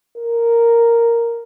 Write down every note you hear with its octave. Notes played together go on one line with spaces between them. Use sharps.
A#4